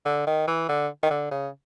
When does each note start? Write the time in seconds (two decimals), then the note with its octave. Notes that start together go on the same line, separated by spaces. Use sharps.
0.06 D3
0.27 D#3
0.48 E3
0.69 D3
1.03 D#3
1.10 D3
1.31 C#3